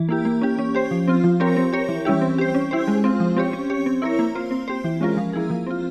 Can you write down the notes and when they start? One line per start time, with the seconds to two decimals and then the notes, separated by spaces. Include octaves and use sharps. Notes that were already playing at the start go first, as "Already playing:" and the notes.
Already playing: E3
0.09 A#3 E4 G4
0.25 A#3
0.42 C#4 G4
0.59 C#4
0.75 G4 C5
0.91 F3
1.08 C4 F4
1.24 F3
1.40 C4 G4 A#4 C#5
1.57 C4
1.73 G4 A#4 C#5
1.89 E3
2.05 G3 C#4 E4 G4
2.21 C4
2.38 G4 C5
2.55 C#4
2.71 E4 G4 C5
2.88 G#3
3.04 C4 F4
3.20 F3
3.37 C4 G4 C#5
3.53 C#4
3.70 G4 C#5
3.86 C4
4.02 E4 A#4 C#5
4.19 A#3
4.35 F4 C5
4.51 C4
4.68 G4 C5
4.84 E3
5.01 G#3 C#4 F4 A#4
5.17 F3
5.33 A#3 E4 G#4
5.50 F3
5.67 C4 F4